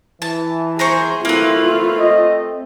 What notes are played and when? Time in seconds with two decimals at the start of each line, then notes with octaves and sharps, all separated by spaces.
0.22 E3 A5
0.79 G#4 A#4 C5 C#6
1.25 A3 A#3 C4 E4 F4 B4
1.99 D#5